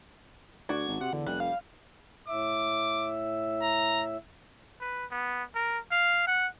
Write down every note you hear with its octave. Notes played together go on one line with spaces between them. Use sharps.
D2 F#4 D5 G#6
G#1
C3 F#5
E2 D3
F1 G3 F#6
F5
A2 E5 D6
A#5
B4
B3
A#4
F5
F#5